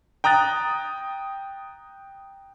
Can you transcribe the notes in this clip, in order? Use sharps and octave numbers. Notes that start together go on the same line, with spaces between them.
G5 A#5 D#6 F#6 A6